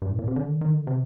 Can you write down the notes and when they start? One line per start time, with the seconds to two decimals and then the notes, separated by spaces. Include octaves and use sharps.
0.02 G2
0.11 A2
0.19 A#2
0.28 C3
0.36 D3
0.48 D#3
0.61 D#3
0.75 D3
0.87 C3